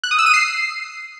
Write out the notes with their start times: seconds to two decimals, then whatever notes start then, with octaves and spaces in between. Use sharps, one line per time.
0.04 F#6
0.11 D#6
0.19 E6
0.26 D#7
0.34 C7